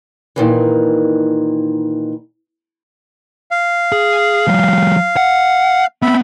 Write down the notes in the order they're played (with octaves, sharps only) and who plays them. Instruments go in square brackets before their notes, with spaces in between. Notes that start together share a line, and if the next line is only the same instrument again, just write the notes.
[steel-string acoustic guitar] A#2 D#3 E3
[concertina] F5
[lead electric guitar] G#4
F3 G3
F#5
[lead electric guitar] B3 C4 [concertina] E5 B5